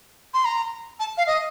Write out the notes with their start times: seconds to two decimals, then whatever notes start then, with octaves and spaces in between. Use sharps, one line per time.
0.34 C6
0.45 A#5
1.00 A5
1.17 F5
1.27 D#5